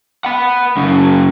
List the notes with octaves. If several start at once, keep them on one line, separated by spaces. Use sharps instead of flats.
F#5 B5
F#2 C#3